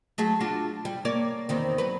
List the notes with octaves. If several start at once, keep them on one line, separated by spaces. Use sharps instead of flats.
F#3 A3 G#4
D4 F4 F#4
G3
A#3 C#5 D5
E2 D#3 C4
F#3 B4